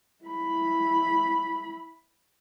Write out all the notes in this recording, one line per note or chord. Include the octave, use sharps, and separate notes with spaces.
E4 B5